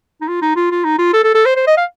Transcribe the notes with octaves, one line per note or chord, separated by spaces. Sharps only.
D#4
F4
D#4
F4
F4
D#4
F4
A4
A4
A4
C5
C5
D#5
F5